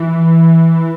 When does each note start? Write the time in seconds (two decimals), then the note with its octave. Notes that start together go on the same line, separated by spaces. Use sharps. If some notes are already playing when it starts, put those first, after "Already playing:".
Already playing: E3